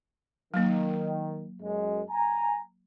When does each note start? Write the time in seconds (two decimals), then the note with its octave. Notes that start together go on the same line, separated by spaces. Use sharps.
0.54 D#3 F#3 A#3
1.62 F#2 G#3
2.10 G#5 A#5